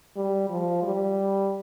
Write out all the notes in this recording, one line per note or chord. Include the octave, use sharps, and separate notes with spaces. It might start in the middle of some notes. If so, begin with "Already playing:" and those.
G3
F3
G3